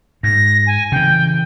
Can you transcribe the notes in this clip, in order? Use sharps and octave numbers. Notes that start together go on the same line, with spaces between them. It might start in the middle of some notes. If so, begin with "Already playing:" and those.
G#2 A#6
G#5
C#3 E3 G5